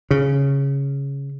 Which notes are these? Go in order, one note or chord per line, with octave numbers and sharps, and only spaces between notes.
C#3